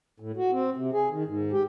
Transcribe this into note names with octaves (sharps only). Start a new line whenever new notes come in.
A2
F#4
C4
C3
G#4
D#3
G#2
G4